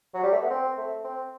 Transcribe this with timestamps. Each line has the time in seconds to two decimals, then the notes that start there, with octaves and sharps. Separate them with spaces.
0.14 F#3
0.23 G3
0.32 A3
0.42 B3
0.50 C4
0.78 A3
1.04 C4